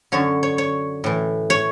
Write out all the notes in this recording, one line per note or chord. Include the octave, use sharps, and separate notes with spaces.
F#2 D3 C#5
C#5
C#5
A2 E3
C#5